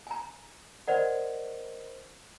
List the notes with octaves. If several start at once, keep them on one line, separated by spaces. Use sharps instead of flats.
G#5 A#5
A#4 C5 D5 D#5 F#5